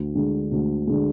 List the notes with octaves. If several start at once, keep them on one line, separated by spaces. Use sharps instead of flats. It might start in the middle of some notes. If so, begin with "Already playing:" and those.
Already playing: D2
D3 G#3
D2
D3 G#3